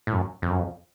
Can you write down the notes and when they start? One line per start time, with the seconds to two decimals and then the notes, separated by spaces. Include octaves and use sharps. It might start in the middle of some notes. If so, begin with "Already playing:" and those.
0.07 A2
0.13 F#2
0.42 F2
0.50 F#2
0.59 F2